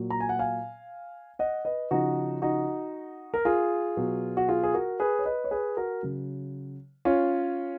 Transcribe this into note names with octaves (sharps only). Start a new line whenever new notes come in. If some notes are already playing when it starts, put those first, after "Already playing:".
Already playing: A#2 F#3
A#5
G#5
F#5
F5 G#5
D#5 F#5
B4 D#5
C#3 F3 D#4 F#4
D#4 F#4
A#4
F4 G#4
B2 F#3
F#4
F4 G#4
G#4
F#4 A#4
G#4 B4
C#5
B4 D#5
C#5
G#4 B4
F#4 A#4
C#3 F#3
C#4 F4